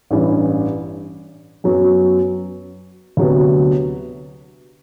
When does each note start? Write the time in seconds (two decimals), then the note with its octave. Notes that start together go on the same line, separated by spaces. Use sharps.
0.11 A1 G2 E3
1.64 F#2 F#3 B3
3.17 D2 C3 F#3 B3